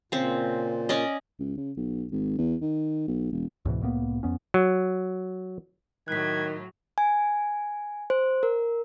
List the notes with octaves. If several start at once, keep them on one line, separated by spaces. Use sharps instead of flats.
A#2 C#3 C4
C#4 D5 D#5
C#2
C#3
B1
G#1
E2
D#3
B1
E1
C#2 G#2 B2 E3
C2 A2 A#3 B3
F2 B3 C#4
F#3
A2 D#3 F#3 F#6 G#6 B6
G#5
C5
A#4